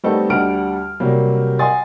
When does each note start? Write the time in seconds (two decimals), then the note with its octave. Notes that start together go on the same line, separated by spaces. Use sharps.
0.04 G3 A3 B3 C4 D#4 A4
0.30 D2 G3 F#5 A5 F6 D7
1.00 C3 F#3 G3 A#3
1.59 D#5 F#5 G#5 C6 D#6 A6